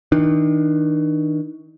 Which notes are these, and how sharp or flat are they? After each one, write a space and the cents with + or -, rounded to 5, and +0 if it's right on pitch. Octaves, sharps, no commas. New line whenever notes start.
D#3 +40 D4 +35